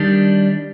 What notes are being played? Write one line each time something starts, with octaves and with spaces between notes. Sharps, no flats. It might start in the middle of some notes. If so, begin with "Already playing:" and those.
Already playing: D#3 G3 D4